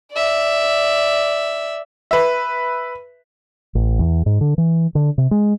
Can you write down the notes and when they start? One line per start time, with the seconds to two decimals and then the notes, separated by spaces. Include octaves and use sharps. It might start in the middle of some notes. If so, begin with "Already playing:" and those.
0.12 D5 E5
2.11 B4 E5
3.75 A1
3.99 E2
4.26 G#2
4.41 D3
4.58 E3
4.95 D3
5.18 C3
5.31 G#3